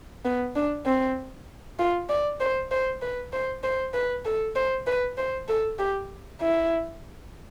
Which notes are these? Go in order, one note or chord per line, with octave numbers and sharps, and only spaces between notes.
B3
D4
C4
F4
D5
C5
C5
B4
C5
C5
B4
A4
C5
B4
C5
A4
G4
E4